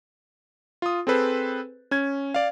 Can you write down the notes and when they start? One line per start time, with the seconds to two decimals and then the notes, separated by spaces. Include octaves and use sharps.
0.82 F4 D#6
1.07 C4 G#4 A4 B4 C5
1.91 C#4 G#6
2.34 D5 F5